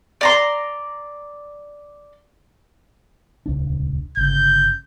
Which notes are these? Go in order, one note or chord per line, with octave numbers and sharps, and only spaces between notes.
D5 A#5 C6
D#1 C#2 D4
G1 C#3 G6